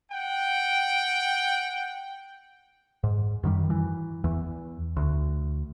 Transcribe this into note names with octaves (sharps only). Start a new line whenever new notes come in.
F#5 G5
G#2
F#2 D#3 G3
E3
E2 E3
D2